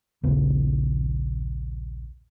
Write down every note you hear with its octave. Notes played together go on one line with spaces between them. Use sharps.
A#1 D#2 C#3 B3